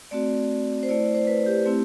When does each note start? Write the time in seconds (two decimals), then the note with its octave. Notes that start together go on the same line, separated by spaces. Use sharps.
0.11 A3 C4 F#4 D5
0.83 C5
0.89 A3 E4 D5
1.15 C5
1.27 B4
1.46 G4
1.66 A3 C4 E4